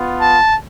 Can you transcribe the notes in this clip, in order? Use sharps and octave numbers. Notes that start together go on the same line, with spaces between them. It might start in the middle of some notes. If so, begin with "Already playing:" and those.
Already playing: B3 F4
A5